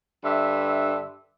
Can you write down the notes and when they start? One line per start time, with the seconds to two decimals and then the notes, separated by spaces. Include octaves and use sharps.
0.23 G2 D3 E5